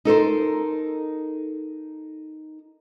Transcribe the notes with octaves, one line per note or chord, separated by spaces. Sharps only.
D#4 A4 A#4 C5